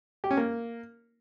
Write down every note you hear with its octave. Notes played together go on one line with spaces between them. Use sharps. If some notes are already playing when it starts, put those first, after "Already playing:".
G4
C#4
A#3